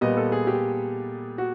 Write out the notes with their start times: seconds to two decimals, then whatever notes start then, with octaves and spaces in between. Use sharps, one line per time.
0.01 A#2 G3 B3 D#5
0.17 A4
0.32 G#4
0.47 G4
1.38 F#4